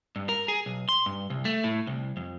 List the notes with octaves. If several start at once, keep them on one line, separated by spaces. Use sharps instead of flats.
G2
A#4
G#4
B1
C6
G2
C2
A3
A2
C2
F2